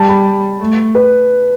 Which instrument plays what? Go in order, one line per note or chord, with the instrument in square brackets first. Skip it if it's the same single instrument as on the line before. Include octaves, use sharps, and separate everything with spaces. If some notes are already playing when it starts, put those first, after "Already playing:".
Already playing: [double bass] G3 [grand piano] A5
[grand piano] B5
[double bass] A3
[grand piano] B4